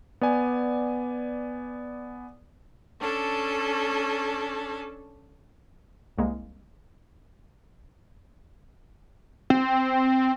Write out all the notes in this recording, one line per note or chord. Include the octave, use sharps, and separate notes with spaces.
B3 D5 G#5
C#4 D4 A4
C2 G#3 A#3
C4